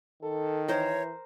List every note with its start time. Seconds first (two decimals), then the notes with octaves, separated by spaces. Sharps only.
0.23 D#3 A4
0.69 E3 A#4 C5 C#5